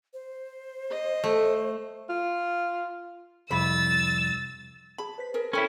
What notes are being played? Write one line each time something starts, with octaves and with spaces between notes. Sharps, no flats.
C5
D#5
A3
F4
C2 F2 B5 E6 A6
G#4 A5 B5
B4 C5 B6
G#4 A#4
C#4 E4 A4 C#5 G5 B5